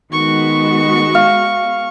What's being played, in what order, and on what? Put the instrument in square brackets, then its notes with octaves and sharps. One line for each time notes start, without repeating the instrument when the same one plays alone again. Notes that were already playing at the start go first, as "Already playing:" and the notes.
[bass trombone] D#3 [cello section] G#3 B3 F#4 [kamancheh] C#6
[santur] F5